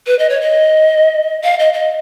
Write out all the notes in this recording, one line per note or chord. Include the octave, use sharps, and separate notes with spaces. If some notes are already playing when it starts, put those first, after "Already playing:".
B4
D#5
C#5
D#5
F5
D#5
D#5